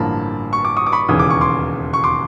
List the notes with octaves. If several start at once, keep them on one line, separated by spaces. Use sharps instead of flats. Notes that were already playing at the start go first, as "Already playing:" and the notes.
Already playing: A1 G2 D3 F3 A#3 A5 B5
C#6
D6
C#6 D#6
D6
B5 C#6
E1 D#2 C#3 E3 D#6
D6
C#6
C6 D6
C#6
C6 D6